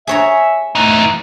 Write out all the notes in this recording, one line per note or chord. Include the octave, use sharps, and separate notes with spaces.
G#4 C#5 E5 A#5
E3 A3 D#4